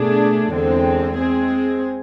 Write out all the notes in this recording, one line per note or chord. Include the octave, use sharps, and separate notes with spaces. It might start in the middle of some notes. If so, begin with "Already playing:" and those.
Already playing: B2 A3 D4 G#4
E2 D3 G#3 C4
G#3 C4 G#4